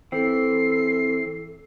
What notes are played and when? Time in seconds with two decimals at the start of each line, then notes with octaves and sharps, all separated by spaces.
0.12 E3 C4 A4 C7